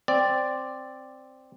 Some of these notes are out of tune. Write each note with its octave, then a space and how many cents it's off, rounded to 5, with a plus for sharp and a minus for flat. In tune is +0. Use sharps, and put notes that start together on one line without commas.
C4 +0 D5 +0